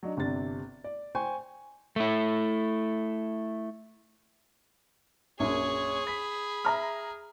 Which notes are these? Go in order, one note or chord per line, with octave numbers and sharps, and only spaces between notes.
F#3 D4 D#4
G1 C3 D4 A6
D5
C5 G5 G#5 C#6
A3 E4
A#1 F#2 G#4 C#5
B5 B6
E5 A#5 F6